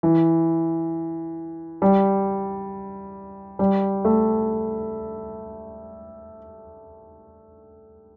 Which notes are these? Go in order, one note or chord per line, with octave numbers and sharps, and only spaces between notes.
E3
G3
G3
A3